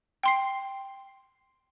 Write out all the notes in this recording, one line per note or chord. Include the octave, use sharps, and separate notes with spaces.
G5 C6 C7